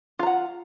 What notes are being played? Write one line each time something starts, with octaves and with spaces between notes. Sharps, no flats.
F4 F#5 A#5